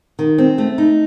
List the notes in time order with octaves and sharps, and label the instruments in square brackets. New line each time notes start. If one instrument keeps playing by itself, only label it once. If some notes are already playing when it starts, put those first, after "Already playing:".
[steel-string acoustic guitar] D#3
C4
A3
D#4